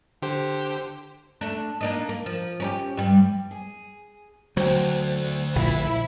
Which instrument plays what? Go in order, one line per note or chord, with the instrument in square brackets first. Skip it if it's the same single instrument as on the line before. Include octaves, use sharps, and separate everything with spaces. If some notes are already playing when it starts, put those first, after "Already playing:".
[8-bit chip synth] D3 G4 C5
[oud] A3 D4
A#3 D4 D#4
A#3
F3
C#4 D#4 G4
G2 G3
[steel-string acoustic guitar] G#4
[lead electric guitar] D2 [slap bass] F#3 [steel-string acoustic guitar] C5 G5
[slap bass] A#1 A#2 [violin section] E4